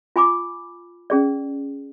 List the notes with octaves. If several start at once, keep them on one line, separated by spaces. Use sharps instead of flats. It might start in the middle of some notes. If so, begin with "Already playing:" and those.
F4 G#5 B5 D6
C#4 G#4 D5